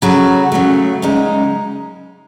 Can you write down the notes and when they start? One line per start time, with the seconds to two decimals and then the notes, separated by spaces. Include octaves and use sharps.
0.02 C#3 F#3 A3 F#4
0.52 C#3 F#3 A3
1.02 F#2 C#3 G#3 D#4